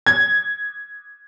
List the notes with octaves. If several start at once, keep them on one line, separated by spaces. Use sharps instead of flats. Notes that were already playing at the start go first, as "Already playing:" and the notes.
G#6